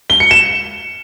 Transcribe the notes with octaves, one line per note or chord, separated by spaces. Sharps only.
G7
C#7
E7